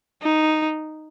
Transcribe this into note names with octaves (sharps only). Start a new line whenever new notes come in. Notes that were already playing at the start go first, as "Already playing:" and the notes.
D#4